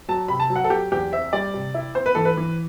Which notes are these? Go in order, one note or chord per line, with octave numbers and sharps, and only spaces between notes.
F#3 A5
C3 B5
A5
F#3
F#5
A4
F#3 G4
E2 G4
C4 E5
G3 D5
C3
E4
C4 C5
B4
E3 A4
B4
E3